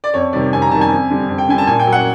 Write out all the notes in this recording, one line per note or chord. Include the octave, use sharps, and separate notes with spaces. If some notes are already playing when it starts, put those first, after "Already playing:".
D5
F2 C#5
C3 D#3 G3 D5
F2 G#5
A#5
C3 D#3 G3 A5
G#5
F2
D3 G3
F2
G5
D3 G3 G#5
A5
A#2 G#5
G5
F#3
F#5